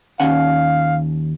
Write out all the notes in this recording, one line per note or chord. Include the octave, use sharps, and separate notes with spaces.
D#2 C#4 F5 F#5